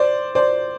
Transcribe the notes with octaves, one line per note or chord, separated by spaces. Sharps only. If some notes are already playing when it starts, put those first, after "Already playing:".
Already playing: C5 D5
C5 D5